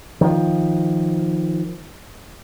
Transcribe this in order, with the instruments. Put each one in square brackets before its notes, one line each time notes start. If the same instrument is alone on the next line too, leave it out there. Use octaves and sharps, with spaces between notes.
[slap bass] D#3 F3